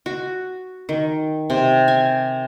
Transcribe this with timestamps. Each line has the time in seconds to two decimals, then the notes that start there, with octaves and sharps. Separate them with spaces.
0.06 F#4
0.89 D#3
1.50 C3
1.88 G#5